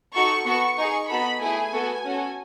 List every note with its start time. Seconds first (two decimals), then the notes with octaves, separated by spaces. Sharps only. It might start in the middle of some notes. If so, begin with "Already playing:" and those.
0.14 D#4 F#4 A4 C#6
0.45 B3 F#4 A4 C#6
0.77 D#4 G#4 C#6
1.09 B3 D#4 F#4 A4 B5
1.41 A3 E4 G#4 G#5
1.73 B3 F#4 A4
2.05 C#4 F#4 A4